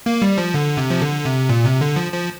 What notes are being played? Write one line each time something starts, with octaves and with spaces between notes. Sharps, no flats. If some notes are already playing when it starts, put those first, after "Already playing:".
A#3
G3
F3
D3
C3
F3
D3
C3
A#2
C3
D3
F3
F3